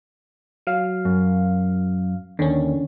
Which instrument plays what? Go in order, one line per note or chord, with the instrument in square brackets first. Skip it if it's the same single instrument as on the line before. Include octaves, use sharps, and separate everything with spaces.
[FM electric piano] F#3 F5
[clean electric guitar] F#2
[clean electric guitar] D#2 [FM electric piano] D3 C#4